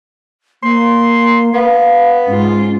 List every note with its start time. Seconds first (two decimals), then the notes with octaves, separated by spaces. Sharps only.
0.63 A#3 C6
1.54 B3 F5
2.27 G#2 C#4 F4